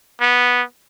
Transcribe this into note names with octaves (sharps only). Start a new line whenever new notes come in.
B3